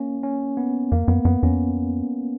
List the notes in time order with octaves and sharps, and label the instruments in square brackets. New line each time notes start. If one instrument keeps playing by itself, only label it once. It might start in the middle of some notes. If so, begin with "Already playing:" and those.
Already playing: [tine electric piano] A#3 C#4
C#4
B3
[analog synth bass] F2 [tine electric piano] A#3
[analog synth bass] F#2 [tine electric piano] B3
[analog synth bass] F#2 [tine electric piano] B3
[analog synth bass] F2 [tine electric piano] C#4